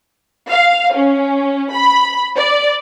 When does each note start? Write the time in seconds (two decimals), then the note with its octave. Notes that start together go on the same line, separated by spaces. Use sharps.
0.50 F5
0.94 C#4
1.73 B5
2.36 D5